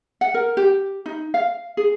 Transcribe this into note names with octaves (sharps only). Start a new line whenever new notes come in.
F#5
A#4
G4
D#4
F5
G#4